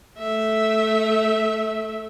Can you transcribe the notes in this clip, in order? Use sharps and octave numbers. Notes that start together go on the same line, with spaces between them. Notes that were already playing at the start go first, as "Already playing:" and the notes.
A3 E5